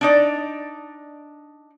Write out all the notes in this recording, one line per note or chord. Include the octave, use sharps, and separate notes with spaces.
D4 D#4 D5